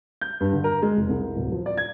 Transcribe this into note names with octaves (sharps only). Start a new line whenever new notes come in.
G6
G2
D3
A#4
G#3
F1
C2
D1
F3
D5
G#6